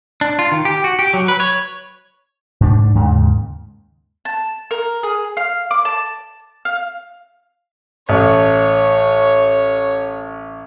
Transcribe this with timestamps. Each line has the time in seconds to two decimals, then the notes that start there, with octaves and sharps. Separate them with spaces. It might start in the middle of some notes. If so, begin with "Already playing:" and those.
0.21 D4
0.39 F4
0.52 D#3
0.65 G4
0.84 F#4
0.99 G4
1.14 F#3
1.28 B4
1.40 C#5
2.61 G#2 D4
2.95 D#2 G#2 C#3
4.25 A5
4.71 A#4
5.03 G#4
5.37 F5
5.71 D6
5.85 A5
6.65 F5
8.09 A1 C#5